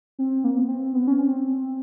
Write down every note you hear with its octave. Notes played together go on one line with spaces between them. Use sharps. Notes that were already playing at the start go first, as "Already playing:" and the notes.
C4
A#3
B3
C4
B3
C#4
C4